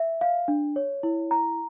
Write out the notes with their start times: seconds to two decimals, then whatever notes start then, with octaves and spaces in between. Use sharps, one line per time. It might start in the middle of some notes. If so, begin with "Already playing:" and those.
Already playing: E5
0.21 F5
0.48 D4
0.76 C#5
1.03 E4
1.31 A#5